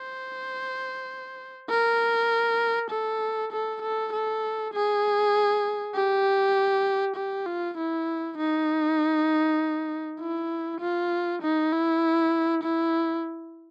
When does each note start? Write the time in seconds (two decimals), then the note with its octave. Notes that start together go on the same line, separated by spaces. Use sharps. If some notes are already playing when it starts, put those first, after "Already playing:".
Already playing: C5
1.70 A#4
2.91 A4
3.52 A4
3.82 A4
4.13 A4
4.73 G#4
5.95 G4
7.16 G4
7.46 F4
7.77 E4
8.38 D#4
10.20 E4
10.80 F4
11.42 D#4
11.72 E4
12.63 E4